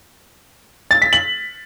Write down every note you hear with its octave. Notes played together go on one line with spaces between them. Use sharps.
A6
B6
F#7